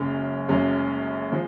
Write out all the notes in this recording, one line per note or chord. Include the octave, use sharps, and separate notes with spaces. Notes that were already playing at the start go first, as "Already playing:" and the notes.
Already playing: F#1 F#2 C#3 G#3 C#4
F#1 F#2 C#3 G#3 C#4
F3 G#3